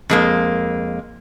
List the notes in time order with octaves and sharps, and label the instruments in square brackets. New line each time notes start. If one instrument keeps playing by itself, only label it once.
[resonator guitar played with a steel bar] F2 G#3 A#3